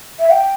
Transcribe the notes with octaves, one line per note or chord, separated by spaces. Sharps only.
E5
G5